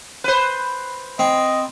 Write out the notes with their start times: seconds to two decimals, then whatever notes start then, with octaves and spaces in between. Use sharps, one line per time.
0.24 B4 C5
1.19 C4 D#5